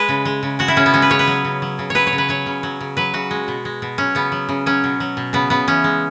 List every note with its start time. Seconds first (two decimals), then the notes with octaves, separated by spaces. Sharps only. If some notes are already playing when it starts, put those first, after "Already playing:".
Already playing: G#3 B4
0.09 C#3
0.25 G#3
0.43 C#3
0.59 G#3 F#4
0.68 E4
0.77 C#3 C#4
0.86 B3
0.94 G#3 C#4
1.02 B4
1.10 C#3 C#5
1.19 B4
1.27 F#3
1.44 C#3
1.62 F#3
1.79 C#3
1.90 F#3 B4 C#5
2.07 C#5
2.13 C#3
2.18 B4
2.29 F#3 C#5
2.46 C#3
2.63 F#3
2.81 C#3
2.97 F#3 B4
3.14 C#3 F#4
3.31 G#3
3.48 B2
3.65 G#3
3.82 B2
3.98 F#3 C#4
4.15 C#3 B3
4.32 F#3
4.49 C#3
4.66 F#3 C#4
4.84 B2
5.00 F#3
5.17 B2
5.33 C#3 B3
5.50 C#3 B3
5.67 E3 C#4
5.84 G#3